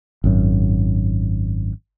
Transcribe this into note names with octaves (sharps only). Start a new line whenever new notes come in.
G#1 F#2